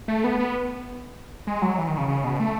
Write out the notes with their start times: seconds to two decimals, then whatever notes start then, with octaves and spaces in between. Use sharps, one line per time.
0.08 A3
0.24 B3
0.39 B3
1.47 G#3
1.62 F#3
1.78 E3
1.88 D#3
1.98 C#3
2.08 C#3
2.24 B2
2.40 A3